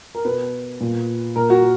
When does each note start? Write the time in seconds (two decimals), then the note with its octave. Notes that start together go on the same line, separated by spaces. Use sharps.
0.15 A#4
0.25 B2 B4
0.81 A#2
1.36 A#2 A#4
1.50 F#4